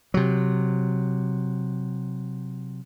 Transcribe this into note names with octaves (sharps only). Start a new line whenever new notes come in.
C3 F#3